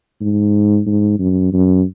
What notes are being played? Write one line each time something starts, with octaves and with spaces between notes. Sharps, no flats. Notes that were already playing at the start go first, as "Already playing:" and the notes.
G#2
G#2
F#2
F#2